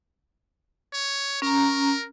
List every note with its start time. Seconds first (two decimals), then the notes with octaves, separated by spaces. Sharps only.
0.93 C#5
1.42 C#4 A#4 A#5